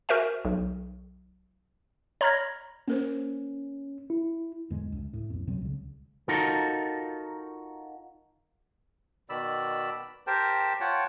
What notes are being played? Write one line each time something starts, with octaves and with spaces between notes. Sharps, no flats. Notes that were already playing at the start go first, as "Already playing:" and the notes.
F#4 A#4 C5 E5 G#5
B1
C#5 A#5 B5 F6 G#6 A#6
A#3 C#4 A#4 C5
E4
E2 G#2 D3 G#3
C#2
A2
B1 F2
B2 F#3 G3 C4
C#2 C#3
D#4 F4 F#4 A4 A#4
B2 D#3 D5 B5 E6
G4 A#4 C5 G5 A5
F4 C#5 F#5 G5 A5